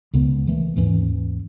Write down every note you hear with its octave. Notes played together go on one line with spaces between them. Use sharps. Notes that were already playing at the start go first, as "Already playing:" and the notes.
C#2 C#3 B3
D#3 E3 A3
D#2 G#2 E3 C#4